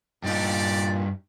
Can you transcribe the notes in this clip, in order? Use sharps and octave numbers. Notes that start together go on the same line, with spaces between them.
G2 A#2 D4 D#4 G4 D5